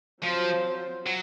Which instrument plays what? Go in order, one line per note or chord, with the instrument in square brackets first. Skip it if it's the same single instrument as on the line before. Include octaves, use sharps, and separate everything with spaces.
[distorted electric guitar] F3 [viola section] F#3 C4 F4 C5
[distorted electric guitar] F#3